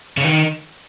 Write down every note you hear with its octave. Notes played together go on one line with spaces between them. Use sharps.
C#3
D#3